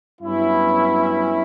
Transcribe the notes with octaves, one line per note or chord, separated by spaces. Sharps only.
G2 F#3 B3 C#4 E4